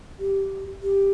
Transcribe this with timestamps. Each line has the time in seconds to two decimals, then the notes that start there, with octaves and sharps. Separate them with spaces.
0.20 G4
0.83 G4